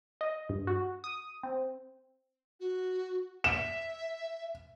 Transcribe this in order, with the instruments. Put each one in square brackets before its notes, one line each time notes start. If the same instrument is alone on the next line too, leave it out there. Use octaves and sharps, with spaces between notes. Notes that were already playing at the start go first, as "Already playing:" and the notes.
[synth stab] D#5
G2
F#4
D#6
C4
[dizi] F#4
[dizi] E5 [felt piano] E7